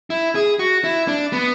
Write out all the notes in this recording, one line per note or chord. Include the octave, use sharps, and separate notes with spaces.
E4
G#4
F#4
E4
D4
B3